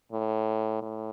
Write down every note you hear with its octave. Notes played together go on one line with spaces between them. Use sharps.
A2
A2